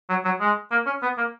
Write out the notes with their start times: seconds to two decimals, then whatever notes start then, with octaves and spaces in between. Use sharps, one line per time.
0.10 F#3
0.25 F#3
0.41 G#3
0.71 A#3
0.87 C#4
1.03 B3
1.18 A#3